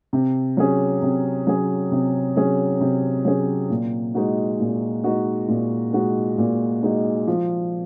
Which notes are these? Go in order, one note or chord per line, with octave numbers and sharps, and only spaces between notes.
C3
F#3 C#4 G#4
C3
F#3 C#4 G#4
C3
F#3 C#4 G#4
C3
F#3 C#4 G#4
A#2
G#3 D#4 F#4
A#2
G#3 D#4 F#4
A#2
G#3 D#4 F#4
A#2
G#3 D#4 F#4
F3